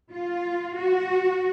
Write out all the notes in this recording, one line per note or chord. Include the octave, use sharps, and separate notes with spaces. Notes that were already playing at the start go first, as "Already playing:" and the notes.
F4
F#4